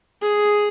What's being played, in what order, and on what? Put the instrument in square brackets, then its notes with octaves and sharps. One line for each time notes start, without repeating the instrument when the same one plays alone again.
[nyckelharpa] G#4